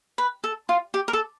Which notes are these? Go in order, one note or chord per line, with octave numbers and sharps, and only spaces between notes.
B4
A4
F4
G4
A#4
A4